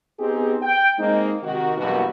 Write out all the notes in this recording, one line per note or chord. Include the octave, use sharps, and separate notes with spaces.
B3 C4 D#4 G4 G#4
G5
G#3 A#3 C4 D#4
C3 D#3 F#4
F#1 E2 G2 B2 A#3 F#4